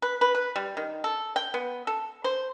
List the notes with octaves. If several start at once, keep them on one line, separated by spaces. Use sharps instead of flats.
B4
B4
B4
G3
D#3
A4
G5
B3
A4
C5